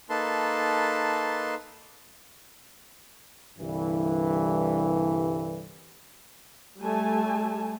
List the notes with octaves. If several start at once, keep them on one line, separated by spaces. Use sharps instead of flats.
A#3 D#4 A4 B4 A5 C6
C2 G2 D3 E3
G3 A3 G#5 A5